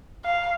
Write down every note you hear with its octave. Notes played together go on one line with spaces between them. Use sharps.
F5